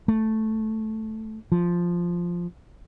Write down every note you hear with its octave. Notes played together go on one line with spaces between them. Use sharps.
A3
F3